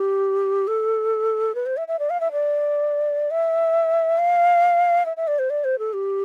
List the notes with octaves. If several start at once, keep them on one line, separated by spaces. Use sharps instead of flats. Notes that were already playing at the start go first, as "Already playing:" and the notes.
Already playing: G4
A4
B4
C5
E5
E5
D5
F5
E5
D5
E5
F5
E5
E5
D5
C5
D5
C5
A4
G4